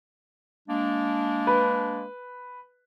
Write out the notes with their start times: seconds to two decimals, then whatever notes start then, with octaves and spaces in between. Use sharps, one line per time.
0.69 G#3 A#3 D4
1.47 B4